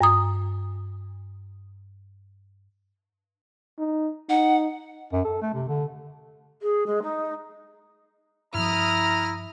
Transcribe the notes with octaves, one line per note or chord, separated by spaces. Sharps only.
G2 A#5 D#6
D#4
D#4 F#5
F#2
A4
A3
C3
D3
G#4
G#3
D#4
G2 F3 E4 A#5 D#6 F6